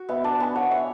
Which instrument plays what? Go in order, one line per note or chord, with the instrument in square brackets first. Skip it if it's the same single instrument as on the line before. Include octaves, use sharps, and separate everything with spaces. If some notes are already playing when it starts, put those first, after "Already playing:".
Already playing: [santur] F#4
[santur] B3 [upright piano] E5
[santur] D4 [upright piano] A5
[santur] B3 [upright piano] G#5
[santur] C#5 [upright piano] F#5
[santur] C#5 [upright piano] E5